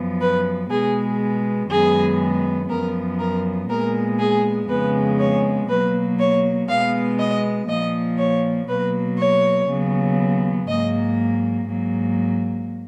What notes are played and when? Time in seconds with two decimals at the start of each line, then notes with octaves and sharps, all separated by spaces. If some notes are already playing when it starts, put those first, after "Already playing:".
Already playing: F#2 F3 B3
0.20 B4
0.70 B2 G#3 B3 G#4
1.69 F#2 D#3 G#3 B3 G#4
2.69 F#2 F3 B3 A#4
3.18 A#4
3.69 A#2 G#3 B3 A#4
4.19 G#4
4.68 F2 C#3 G#3 B3 B4
5.19 C#5
5.68 B2 F#3 A#3 B4
6.18 C#5
6.68 B2 G#3 B3 F5
7.18 D#5
7.68 A#2 F3 A#3 D#5
8.18 C#5
8.67 B2 F#3 A#3 B4
9.17 C#5
9.67 D#2 C#3 F#3 B3
10.67 G#2 F#3 A#3 D#5
11.67 G#2 F#3 A#3